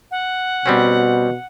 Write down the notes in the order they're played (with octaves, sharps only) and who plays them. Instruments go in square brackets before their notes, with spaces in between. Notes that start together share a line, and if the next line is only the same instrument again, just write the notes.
[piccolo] F#5
[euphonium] B2 [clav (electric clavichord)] G3 C4 C#4